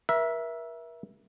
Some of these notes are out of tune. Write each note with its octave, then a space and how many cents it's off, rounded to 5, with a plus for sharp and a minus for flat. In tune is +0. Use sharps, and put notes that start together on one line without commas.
A#4 +40 E5 +0